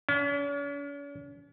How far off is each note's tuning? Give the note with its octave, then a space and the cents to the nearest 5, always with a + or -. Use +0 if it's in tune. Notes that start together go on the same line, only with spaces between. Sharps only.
C#4 +45